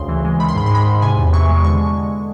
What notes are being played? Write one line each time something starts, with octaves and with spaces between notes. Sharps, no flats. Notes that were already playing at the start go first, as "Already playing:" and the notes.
Already playing: D2 C#3 C6
E3
G#3
D#3 B5
C6
G#2 B5
C6
G#3 B5
G#2
C3 G#5
E2
E3 C#6
G#3
D3 C#6